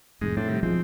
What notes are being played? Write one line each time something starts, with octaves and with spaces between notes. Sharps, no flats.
F1 G#2 G#3
A2 C4 D4
C3 D#3 G3
B1 F3 G#3 C4